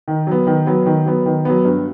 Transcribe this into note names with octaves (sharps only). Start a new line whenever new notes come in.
D#3
F#3 B3
D#3
F#3 B3
D#3
F#3 B3
D#3
F#3 B3
G2